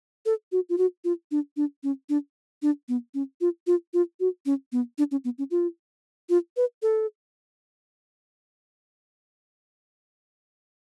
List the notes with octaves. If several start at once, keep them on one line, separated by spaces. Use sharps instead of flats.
A4
F#4
F4
F#4
F4
D4
D4
C#4
D4
D4
B3
C#4
F4
F4
F4
F#4
C#4
B3
D4
C#4
B3
C#4
F4
F4
B4
A4